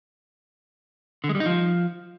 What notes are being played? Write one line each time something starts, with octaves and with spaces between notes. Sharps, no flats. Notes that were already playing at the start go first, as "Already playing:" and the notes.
D3
G#3
G3
D#4
F3